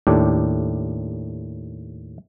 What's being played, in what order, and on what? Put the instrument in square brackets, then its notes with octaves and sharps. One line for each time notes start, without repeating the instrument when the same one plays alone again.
[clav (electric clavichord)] D#2 A2 D4 G4